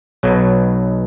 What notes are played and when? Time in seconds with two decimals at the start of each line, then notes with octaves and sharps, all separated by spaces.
0.23 B1 B2 F#3